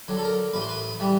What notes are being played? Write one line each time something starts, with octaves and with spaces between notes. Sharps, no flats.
D3 F#3
A4
A#4
A1 B4
C5
B4
E3 G3